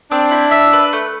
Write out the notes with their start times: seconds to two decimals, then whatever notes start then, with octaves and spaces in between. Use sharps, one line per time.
0.11 C4 D4
0.31 E4
0.51 E5
0.73 B4
0.93 A3